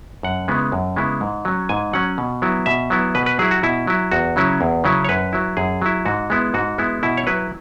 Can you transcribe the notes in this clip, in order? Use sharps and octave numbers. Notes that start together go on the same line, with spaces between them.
F#2 F#5
C#3 G#3 B3 E4
F#2
C#3 G#3 B3 E4
G#2
F#3 C#4
G#2 G#5
F#3 C#4 F#5
B2
F#3 B3 E4
B2 E5
F#3 B3 E4
B2 B4
B4
F#3 E4 G#4
F#4
B2 E4
F#3 E4
E2 F#4
C#3 F#3 C#4 E4
E2
C#3 F#3 C#4 E4
C#5
F#2 B4
F#3 E4
F#2 G#4
F#3 E4
G#2 F#4
G#3 B3 E4
G#2 F#4
G#3 B3 E4
B2 E4
C#5
F#3 E4 B4